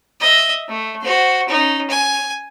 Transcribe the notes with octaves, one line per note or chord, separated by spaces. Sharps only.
D#5 E5
A3
F#4 C5
C#4 D#4
G#5